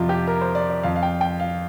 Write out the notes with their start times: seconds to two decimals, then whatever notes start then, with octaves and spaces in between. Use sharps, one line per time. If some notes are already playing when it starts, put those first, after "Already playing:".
Already playing: F2 C3 F3 F4
0.09 G4
0.27 A#4
0.41 C5
0.55 D5
0.70 D5
0.83 F2 F3 F5
0.96 F5
1.03 G5
1.21 G5
1.40 F5